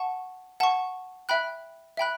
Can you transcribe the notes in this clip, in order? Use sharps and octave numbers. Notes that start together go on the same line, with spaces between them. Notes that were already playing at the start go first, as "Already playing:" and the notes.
Already playing: F#5 A5 C#6
F#5 A5 C#6
E5 G5 B5 F#6
E5 G5 B5 F#6